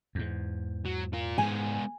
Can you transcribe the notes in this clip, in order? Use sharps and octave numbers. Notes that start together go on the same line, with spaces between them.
E2 G#2
F#3
F4 A#4
G#2 G#3 B3 G#5